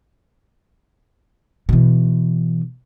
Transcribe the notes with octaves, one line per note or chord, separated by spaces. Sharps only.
B2 E3